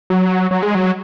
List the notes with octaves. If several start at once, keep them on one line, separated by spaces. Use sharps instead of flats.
F#3
F#3
G#3
F#3